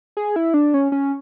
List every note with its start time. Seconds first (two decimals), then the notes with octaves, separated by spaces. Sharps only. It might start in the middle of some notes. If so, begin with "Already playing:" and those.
0.17 G#4
0.36 E4
0.54 D4
0.74 C#4
0.92 C#4